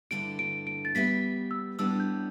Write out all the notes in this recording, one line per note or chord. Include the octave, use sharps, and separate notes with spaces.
G2 D3 A3 E4 D7
D7
D7
A6
G3 B3 G4 E5 B6
E6
A2 G3 B3 D4 E6
G6